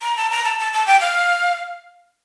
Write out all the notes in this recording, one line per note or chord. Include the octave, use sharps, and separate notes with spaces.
A#5
A5
A#5
A5
A5
A5
G5
F5